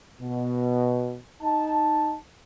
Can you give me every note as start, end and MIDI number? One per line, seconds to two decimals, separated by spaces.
0.21 1.19 47
1.42 2.16 63
1.42 2.16 81